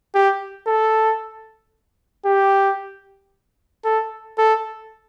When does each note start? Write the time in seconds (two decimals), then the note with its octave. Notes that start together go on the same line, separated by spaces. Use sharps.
0.15 G4
0.67 A4
2.26 G4
3.84 A4
4.38 A4